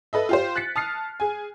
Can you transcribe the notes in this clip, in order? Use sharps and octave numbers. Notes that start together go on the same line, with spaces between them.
A4 B4 D#5 E5
F4 G4 C5
F#6 A6 B6 C#7
A5 D#6 F6 C7
G#4 G#5